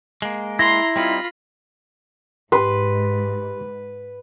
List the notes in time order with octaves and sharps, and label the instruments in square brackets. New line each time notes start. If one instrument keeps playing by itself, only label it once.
[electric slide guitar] G#3 A#3
[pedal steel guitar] E4 [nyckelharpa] A#5 C6 [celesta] A#6
[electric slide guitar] G3 C4 D#4 [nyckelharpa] F4 B5
[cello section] G#2 [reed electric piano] G4 C6 [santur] B4